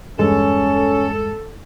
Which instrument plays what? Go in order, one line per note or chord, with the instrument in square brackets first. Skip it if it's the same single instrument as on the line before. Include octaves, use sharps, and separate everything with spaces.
[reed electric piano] E2 G2 G#3 [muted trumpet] C#4 [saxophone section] A4